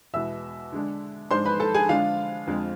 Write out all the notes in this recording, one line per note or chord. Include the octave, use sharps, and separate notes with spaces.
E2 B2 G#3 B3 E5 E6
D3 G#3 D4
G#2 G#3 D4 C5 C6
B4 B5
A4 A5
G#4 G#5
D3 F3 G#3 D4 F4 F5
F2 D3 F3 G#3 C4